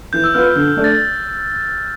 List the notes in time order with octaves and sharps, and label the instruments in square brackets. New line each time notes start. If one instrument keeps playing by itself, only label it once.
[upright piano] E3 [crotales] G6
[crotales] E6
[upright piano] B3 F4 B4 [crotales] F6
[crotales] G6
[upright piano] D3 [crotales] G6
[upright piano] A3 D4
[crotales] A6